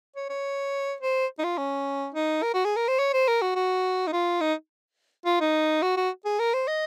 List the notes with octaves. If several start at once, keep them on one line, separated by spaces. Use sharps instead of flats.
C#5
C#5
C5
D#4
F4
C#4
D#4
A#4
F#4
G#4
A#4
C5
C#5
C5
A#4
F#4
F#4
D#4
F4
D#4
F4
D#4
F#4
F#4
G#4
A#4
C5
D#5